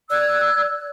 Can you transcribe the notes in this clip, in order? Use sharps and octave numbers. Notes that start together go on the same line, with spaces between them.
D5 E6 F#6 G#6